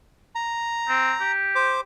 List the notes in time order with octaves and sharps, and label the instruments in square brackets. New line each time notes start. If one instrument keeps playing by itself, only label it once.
[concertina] A#5
[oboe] C4
G4
[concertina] C5 D6